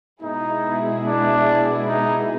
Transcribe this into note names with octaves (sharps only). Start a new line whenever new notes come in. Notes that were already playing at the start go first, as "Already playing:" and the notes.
B2 G#3 B3 D#4 E4 G#4
D4
D#4